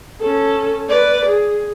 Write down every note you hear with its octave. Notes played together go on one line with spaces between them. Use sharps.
C#4 A4
B4 D5
G#4